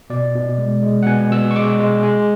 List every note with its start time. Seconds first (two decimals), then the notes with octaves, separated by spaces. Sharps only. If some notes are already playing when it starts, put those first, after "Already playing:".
0.10 B2 D5
0.35 B2
0.58 G#3
0.83 G#3
1.03 F#5
1.07 B2 G#5
1.31 B2 E6
1.51 C#6
1.55 G#3 D6
1.80 G#3
2.04 G#3